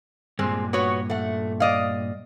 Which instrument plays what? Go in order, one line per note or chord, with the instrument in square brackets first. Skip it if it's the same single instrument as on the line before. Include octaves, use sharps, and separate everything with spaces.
[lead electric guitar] G2 A#2 [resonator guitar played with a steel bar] G#3 C4
[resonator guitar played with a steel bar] B3 F#4 C#5
A3 F#5
D5 D#5 F5